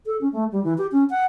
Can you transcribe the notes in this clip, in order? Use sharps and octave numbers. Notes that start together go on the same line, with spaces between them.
A4
C#4
A3
G3
E3
G4
C#4
F#5